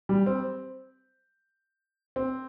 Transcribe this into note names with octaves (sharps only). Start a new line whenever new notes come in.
G3
C4
C4